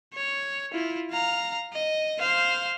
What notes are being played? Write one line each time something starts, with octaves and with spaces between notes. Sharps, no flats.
C#5
E4 F4
F5 A#5
D#5
C5 F5